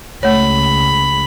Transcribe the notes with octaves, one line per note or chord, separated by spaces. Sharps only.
C#2 A3 C#5 B5